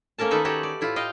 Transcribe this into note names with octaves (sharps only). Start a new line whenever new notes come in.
A3 A#3 C#4 A#4 A5
D#3 D#4 A4 B4 E5 A#5
F#4 G4 A4 C#5 F#5
D5
A2 E4 F4
D#5 F5 G5